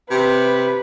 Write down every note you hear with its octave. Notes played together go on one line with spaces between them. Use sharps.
C3 B4